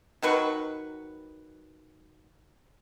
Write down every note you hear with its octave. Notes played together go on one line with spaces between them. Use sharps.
D#3 F#3 B4 C#6